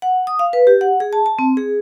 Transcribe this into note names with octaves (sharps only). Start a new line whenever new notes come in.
F#5
D#6
F5
B4
G4
F#5
G#4
A5
A5
C4
G#4